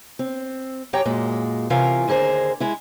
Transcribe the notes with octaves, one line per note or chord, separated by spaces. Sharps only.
C4
F#2 G4 C#5 G5 A#5
F#2 A#2 G#3
C3 E3 C#4 F4 A#4 F5
D#2 D3 G#4 A#4 C5
G#3 E4